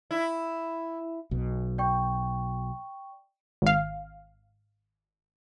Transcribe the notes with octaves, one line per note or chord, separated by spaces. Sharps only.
E4
B1 B2
D5 G5 C#6
G#1 F5